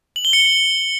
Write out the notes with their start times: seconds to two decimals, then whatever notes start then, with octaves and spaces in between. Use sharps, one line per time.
0.16 F#7
0.25 G7
0.33 C#7